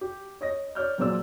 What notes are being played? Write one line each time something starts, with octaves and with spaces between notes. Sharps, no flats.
G4
C#5 D#5 A#6
C#5 D5 F6 G6
A#2 F#3 G#4 C5 D5 E6